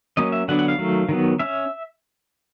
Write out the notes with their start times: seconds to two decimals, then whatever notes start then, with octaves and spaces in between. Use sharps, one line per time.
0.17 F#3 A#3 C#4 D#5
0.32 E5
0.48 D3 F#3 B3 D4 F#5
0.59 F#5
0.68 F5
0.78 D#3 F#3 A3
1.09 D#3 F#3 B3
1.39 C#4 E5